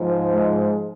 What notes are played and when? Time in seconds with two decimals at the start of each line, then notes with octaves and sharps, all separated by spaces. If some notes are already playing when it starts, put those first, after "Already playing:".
Already playing: G#2 F3
0.31 G#3